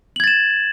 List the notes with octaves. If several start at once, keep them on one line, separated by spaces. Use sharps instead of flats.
G#6 A6 E7 F#7